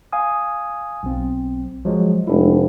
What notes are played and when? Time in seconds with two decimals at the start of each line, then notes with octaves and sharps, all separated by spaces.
0.12 F5 G#5 D#6
1.03 B1 C4
1.85 F3 F#3 G#3
2.27 F1 G#3 D4 E4